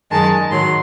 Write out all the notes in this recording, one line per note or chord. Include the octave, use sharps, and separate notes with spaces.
F#2 D#3 G#3 A5
G#2 D#3 F#3 C6